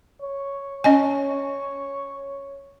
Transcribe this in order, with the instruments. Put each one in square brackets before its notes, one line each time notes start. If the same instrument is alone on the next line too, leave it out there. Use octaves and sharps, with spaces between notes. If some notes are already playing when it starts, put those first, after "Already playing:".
[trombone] C#5
[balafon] C#4 D#5 G#5